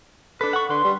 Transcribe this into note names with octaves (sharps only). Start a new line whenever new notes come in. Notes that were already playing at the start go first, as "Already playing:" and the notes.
D4 A4 B4
F#5 C#6
D3 B4 C6
G3